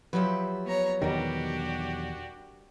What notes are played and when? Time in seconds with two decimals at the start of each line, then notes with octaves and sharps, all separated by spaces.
0.13 F3 F#3 G4 B4 E5
0.65 B3 C#5 A#5
1.02 E2 B2 D#3 G3 D4 F#4 G4 A#4